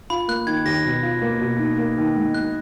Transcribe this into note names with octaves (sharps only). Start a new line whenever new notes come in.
F4 B5
A#3 F#6
D#3 G#6
D#2 A#6
B2
F4
A#3
B2
D#4
A#3
D#3
G#2
D#4 F#6